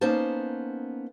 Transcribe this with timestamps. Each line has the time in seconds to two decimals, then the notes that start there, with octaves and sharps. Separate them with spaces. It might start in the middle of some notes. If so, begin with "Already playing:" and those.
0.01 A#3 B3 C#4 D#4 C5 A5